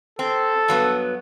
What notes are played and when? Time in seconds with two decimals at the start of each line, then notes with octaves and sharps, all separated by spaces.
0.19 C4 A4
0.68 G2 F#3 B3